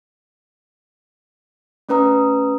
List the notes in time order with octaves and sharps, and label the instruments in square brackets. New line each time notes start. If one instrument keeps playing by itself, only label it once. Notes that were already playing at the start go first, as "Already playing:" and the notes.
[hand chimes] A3 C#4 B4 A#5 D#6